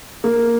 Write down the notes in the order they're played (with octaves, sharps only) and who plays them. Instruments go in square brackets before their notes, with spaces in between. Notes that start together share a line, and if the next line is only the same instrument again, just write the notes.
[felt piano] A#3